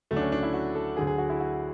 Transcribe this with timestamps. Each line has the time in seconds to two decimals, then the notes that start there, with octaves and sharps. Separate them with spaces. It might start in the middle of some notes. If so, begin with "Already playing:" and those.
0.11 D2 C#3 F#3 A3
0.16 D4
0.21 C#4
0.32 D4
0.43 E4
0.54 F#4
0.75 A4
0.97 D2 D3 F#3 G#4
1.07 G#4
1.18 F#4
1.30 E4
1.40 F#4